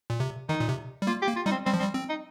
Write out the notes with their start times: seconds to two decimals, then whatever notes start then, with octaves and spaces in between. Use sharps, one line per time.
0.10 A#2
0.20 C3
0.49 D#3 D#4
0.60 A#2
0.69 C3
1.02 G3
1.07 A#3 F4
1.22 G4
1.27 A#3
1.36 F4
1.46 G3 D#4
1.51 C4
1.65 G3 C4
1.74 F3
1.80 G3 C4
1.94 C4
2.09 D#4